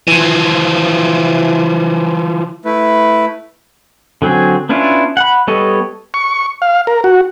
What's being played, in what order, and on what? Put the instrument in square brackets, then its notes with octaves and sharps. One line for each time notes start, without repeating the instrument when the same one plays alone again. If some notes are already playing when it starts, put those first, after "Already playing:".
[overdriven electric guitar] E3 F3
[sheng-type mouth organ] A3 E4 B4
[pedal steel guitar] D3 F#3 C4 G#4
B3 C#4 D4 E4 F4
F#5 B5
G3 B3 A4 C#5 D#5
[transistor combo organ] C#6
F5
A#4
F#4